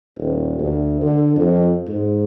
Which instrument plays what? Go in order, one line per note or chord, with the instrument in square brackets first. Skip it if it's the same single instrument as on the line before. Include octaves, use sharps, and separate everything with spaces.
[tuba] D#1
D2
D3
F2
G#2